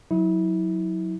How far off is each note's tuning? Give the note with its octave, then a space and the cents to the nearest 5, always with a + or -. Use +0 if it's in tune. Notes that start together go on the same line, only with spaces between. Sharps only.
F#3 -15 E4 -30